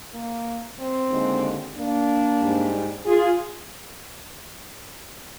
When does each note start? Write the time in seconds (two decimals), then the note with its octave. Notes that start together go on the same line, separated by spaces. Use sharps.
0.12 A#3
0.76 C4
1.08 D#2 D3 G#3
1.75 A#3 D4
2.40 G#2 G3
3.05 F4 G#4